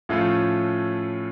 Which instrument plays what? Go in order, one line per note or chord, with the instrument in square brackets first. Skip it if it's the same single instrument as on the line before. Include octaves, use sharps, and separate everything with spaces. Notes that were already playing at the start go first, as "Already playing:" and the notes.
[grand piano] A2 F3 A3 C#4 F4